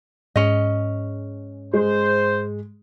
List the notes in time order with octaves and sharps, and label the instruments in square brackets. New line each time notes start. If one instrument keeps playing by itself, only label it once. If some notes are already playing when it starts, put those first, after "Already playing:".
[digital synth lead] G#2 [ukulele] C#4 D#5
[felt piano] G#3 [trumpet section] C5